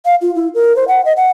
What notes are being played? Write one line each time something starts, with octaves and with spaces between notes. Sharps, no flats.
F5
F4
E4
A#4
C5
F#5
D#5
F#5